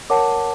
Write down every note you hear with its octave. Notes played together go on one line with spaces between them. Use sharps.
A#4 C#5 F#5 A5 D6